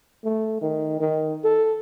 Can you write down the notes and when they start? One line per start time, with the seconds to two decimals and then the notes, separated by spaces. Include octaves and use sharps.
0.25 A3
0.62 D#3
1.00 D#3
1.44 A4